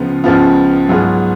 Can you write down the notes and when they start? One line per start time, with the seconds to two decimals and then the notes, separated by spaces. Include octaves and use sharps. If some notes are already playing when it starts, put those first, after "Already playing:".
Already playing: C#2 C#3 F3 B3 F4
0.24 C#2 C#3 F3 B3 F4
0.89 G#2 F#3 B3 F4 G#4